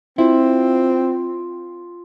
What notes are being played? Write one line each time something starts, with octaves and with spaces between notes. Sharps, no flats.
C4 E4 F4 E6